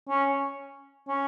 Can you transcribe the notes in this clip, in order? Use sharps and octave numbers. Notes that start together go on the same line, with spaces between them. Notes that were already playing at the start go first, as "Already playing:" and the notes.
C#4
C#4